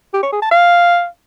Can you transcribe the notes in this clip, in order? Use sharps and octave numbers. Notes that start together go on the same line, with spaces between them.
G4
C#5
G#4
A5
F5